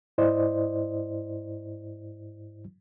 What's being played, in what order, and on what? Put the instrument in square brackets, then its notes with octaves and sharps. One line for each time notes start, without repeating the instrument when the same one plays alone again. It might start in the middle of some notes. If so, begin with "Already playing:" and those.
[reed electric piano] G#2 E4 C5 D5 D#5